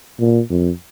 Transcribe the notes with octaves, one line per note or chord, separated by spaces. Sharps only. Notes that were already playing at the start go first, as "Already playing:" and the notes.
A#2
F2